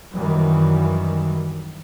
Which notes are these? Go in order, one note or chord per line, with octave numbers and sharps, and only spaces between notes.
F#2 D#3 E3 F#3 G3